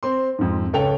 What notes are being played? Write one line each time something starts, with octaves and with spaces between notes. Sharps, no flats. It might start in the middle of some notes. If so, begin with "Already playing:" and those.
C4 C6
F2 G#2
C#2 C#4 A4 C#5 G5 F7